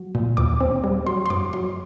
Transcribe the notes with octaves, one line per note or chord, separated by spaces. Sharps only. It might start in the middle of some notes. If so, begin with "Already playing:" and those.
Already playing: F#3
A#2
D#2 D6
C4
G3
F#3 C6
C6
F#2 D6
F#3 C6